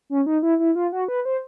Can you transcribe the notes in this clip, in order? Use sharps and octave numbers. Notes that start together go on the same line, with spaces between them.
C#4
D#4
E4
E4
F4
F#4
B4
C5